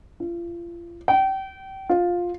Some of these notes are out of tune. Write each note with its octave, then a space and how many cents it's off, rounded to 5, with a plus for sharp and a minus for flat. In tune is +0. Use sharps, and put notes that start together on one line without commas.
F4 -35
G5 -30
F4 +10